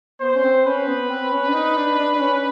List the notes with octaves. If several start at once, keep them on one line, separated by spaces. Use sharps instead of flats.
B3 C5
C#4
C4
C#4 B4
B3
C4
C#4
D4
D#4
D4
D4
D4
C#4